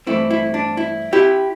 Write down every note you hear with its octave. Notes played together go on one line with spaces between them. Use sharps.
G2 E3 A3 C4 E4
E4
D4
E4
E4 G4